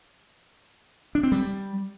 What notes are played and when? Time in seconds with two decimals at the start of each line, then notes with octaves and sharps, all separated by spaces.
1.15 D4
1.23 C4
1.32 G3